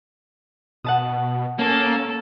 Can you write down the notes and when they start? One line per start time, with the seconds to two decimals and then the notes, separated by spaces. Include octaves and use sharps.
0.84 B2 F#5 A5 D#6
1.59 A#3 C#4 A4